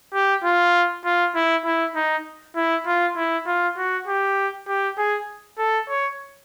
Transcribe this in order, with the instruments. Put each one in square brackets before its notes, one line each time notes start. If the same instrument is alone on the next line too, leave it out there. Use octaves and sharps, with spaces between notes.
[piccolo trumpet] G4
F4
F4
E4
E4
D#4
E4
F4
E4
F4
F#4
G4
G4
G#4
A4
C#5